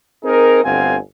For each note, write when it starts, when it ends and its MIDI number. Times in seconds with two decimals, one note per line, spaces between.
0.24 0.64 60
0.24 0.64 63
0.24 0.64 68
0.24 0.64 70
0.64 0.97 31
0.64 0.97 38
0.64 0.97 60
0.64 0.97 77
0.64 0.97 78
0.64 0.97 80